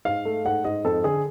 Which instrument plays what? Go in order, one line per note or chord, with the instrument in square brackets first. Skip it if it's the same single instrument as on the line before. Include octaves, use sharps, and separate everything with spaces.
[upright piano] G#2 F5
A3
G#2 F#5
G#2 D#5
F2 A4
D3 G#4